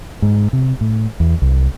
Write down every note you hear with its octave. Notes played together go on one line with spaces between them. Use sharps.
G#2
C3
A2
E2
C2